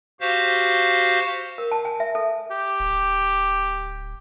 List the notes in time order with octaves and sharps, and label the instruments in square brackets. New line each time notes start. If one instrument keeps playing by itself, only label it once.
[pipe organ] F#4 G4 C5 F5
[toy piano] A#4
A5
G#5
E5
A4
[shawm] G4
[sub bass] D1